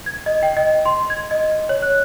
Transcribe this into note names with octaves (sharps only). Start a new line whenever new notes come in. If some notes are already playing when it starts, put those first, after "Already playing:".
G#6
D#5
G5
D#5
C6
G#6
D#5
C#5
F#6